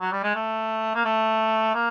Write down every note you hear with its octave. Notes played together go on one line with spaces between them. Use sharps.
F#3
G3
G#3
A3
A#3
A3
A#3